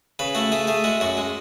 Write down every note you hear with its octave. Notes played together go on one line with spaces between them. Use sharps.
C#3 B4
A3 F#4
A3 G#4
A3 G#4
G#3 F#4
F#2 F#4
G#3